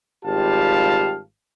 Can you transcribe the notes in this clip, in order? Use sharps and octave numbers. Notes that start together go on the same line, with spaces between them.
G#1 G3 F4 G4 F5 A5